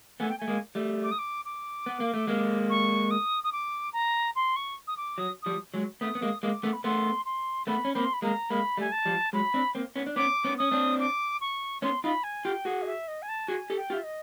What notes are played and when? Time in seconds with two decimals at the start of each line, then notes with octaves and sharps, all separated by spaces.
0.20 A3 B3 G#5
0.29 G5
0.38 A3 G#5
0.48 G#3 A#3
0.75 G3 A3
1.03 D6
1.11 D#6
1.18 D6
1.45 D6
1.86 B3
2.00 A#3
2.14 A3
2.27 G#3 A#3
2.70 C#6
3.11 D#6
3.44 D#6
3.52 D6
3.93 A#5
4.36 C6
4.56 C#6
4.87 D#6
4.97 D6
5.18 F#3 D#6
5.42 F3 G3 D#6
5.74 F#3 G#3
6.01 A3 B3 D#6
6.15 B3
6.22 G#3 A#3
6.43 G#3 A#3 D6
6.63 A3 B3
6.73 B5
6.84 A3 B3 C6
7.25 C6
7.67 A3 B3 B5
7.85 C#4
7.95 A#3 C4 B5
8.04 C6
8.13 B5
8.22 G#3 A#3 A#5
8.50 G#3 A#3 B5
8.77 G3 A3 G#5
8.92 A5
9.05 F3 G3
9.33 F#3 G#3 B5
9.54 C4 D4
9.75 A#3 C4
9.96 B3 C#4
10.07 D4
10.16 B3 C#4 D6
10.44 B3 C#4
10.58 C#4 D#6
10.71 C4 D4
11.00 D6
11.41 C#6
11.82 B3 C#4 C6
12.04 D#4 F4 B5
12.24 G#5
12.45 F4 G4 G5
12.65 F#4 G#4 F#5
12.82 D#5
12.86 E5
13.08 D#5
13.22 G#5
13.29 A5
13.48 F#4 G#4 G#5
13.70 G4 A4
13.77 G5
13.90 F4 G4
13.93 E5
14.04 D#5